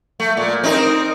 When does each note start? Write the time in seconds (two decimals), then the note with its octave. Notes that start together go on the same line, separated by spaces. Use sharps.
0.20 A3
0.37 A#2
0.64 C4 D#4 A#4